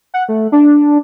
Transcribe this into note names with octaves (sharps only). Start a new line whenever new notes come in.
F#5
A3
D4